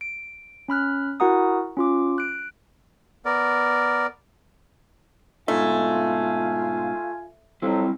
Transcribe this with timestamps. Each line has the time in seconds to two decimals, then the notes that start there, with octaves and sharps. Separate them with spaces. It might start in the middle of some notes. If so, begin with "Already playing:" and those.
0.01 D7
0.68 C#4 B5 F6 F#6
1.20 E4 F#4 A#4 F#5 A#5 D#6
1.77 C#4 F4 D6
2.18 F#6 D7
3.25 B3 A#4 D5
5.48 G#2 B2 A3 D#4 F4 G#5
7.62 F2 F#3 G3 C4 E4